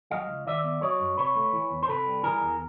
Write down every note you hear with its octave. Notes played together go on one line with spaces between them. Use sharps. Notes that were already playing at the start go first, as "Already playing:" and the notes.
F#3 D#5 F5
C#2
D#3 D5 E5
B3
F#3 C#5 D#5
F#2
C3 B4 C#5
A3
E3
E2
C5
C3 A4 B4
G3
E3 G#4 A#4
E2